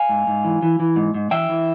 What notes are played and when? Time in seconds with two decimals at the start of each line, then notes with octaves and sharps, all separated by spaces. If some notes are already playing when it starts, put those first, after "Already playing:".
Already playing: F5 G#5
0.09 G#2
0.27 G#2
0.44 E3
0.62 E3
0.80 E3
0.96 G#2
1.14 G#2
1.31 E3 E5 G5
1.49 E3